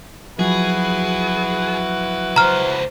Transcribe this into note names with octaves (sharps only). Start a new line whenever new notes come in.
F3 F#3 E4 F#4 G#4 B4
C#2 C5 A#5 F6